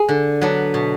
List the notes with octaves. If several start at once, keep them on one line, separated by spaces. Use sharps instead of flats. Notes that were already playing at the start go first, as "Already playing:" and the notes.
Already playing: G#4
D3
F#3 B3 D4
B2